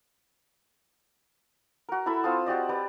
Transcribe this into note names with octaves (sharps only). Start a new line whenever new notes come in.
F#4 A#4
E4 A4 E5 B5
C4 F4 A5 D#6
F#4 G4 D5 D#5
G4 B4 D5